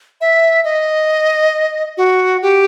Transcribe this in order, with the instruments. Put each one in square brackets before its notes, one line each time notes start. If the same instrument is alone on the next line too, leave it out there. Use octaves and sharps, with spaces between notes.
[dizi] E5
D#5
F#4
G4